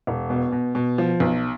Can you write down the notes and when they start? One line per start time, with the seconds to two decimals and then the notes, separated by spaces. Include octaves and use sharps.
0.07 E1
0.30 B2
0.52 B2
0.75 B2
0.98 F3
1.20 B1